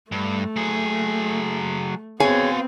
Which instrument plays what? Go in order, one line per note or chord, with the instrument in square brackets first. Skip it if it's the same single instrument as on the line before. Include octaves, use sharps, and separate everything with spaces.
[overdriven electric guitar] G2 [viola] A3
[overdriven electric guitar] F#3 G#4
[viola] B3 C4 [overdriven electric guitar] F#4 F5 [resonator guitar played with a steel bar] G#4 C#5 G#5